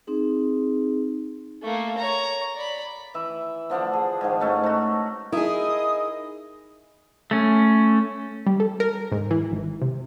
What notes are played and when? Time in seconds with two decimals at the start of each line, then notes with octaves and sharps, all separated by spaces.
0.07 C4 D#4 G#4
1.63 A3 A#3
1.98 C#5 A#5
2.56 D5 B5
3.14 E3 E5
3.70 D3 F3 D4 F#5
3.93 G#4
4.21 G#2 D#3 F3
4.40 G#2 A3 C#4 D#4
4.63 A3 F#4
5.32 D#4 E4 G#4 A#4 D#5 D#6
7.31 A3 C#4
8.47 G3
8.60 A4
8.80 A#4
9.12 G#2
9.31 E3
9.52 G#1
9.82 C3